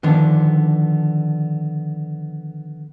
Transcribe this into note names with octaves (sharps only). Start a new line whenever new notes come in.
D3 D#3 F3 B3 D4